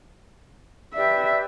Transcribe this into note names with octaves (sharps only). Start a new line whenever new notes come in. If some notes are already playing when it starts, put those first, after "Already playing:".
G4 B4 D5 E5